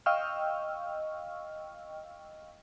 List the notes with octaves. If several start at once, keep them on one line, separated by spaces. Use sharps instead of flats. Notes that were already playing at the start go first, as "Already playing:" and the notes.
D#5 F5 G5 C#6 E6 F6